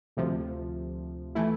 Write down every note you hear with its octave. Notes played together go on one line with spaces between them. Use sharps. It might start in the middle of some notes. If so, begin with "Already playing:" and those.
D2 C3 F3
E3 A3 E4